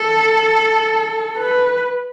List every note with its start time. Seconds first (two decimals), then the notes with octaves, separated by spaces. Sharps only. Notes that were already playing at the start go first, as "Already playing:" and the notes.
Already playing: A4
1.38 B4